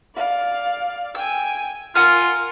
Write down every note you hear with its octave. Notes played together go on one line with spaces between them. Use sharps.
D5 F5
G5 G#5 E6
F4 A#4 F#5 G#5 F6